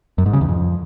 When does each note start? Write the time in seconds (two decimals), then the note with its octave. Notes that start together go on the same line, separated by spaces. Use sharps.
0.18 F#2
0.26 G#2
0.33 C#3
0.41 E2
0.49 F2